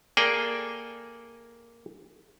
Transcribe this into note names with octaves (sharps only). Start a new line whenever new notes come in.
A#3 G#4 A4 D5 G5 G#5